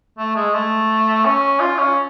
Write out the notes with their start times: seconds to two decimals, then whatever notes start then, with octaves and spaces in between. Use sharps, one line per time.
0.18 A3
0.36 G#3
0.54 A3
1.25 C#4
1.60 F4
1.78 C#4